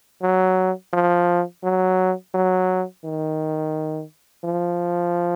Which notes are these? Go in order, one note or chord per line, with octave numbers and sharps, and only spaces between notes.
F#3
F3
F#3
F#3
D#3
F3